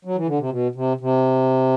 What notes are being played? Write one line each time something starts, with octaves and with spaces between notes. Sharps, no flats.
F#3
E3
D3
C3
B2
C3
C3